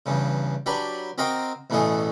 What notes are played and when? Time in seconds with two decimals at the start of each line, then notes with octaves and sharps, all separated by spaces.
0.06 E2 G2 C#3
0.66 F#3 D4 G4 B4
1.18 C4 F#4 A#4 D#5 F5 G5
1.70 A1 E2 B2 E3 A3 G#4